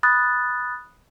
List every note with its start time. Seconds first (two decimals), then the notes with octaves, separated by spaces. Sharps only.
0.03 B5 D#6 F#6 A6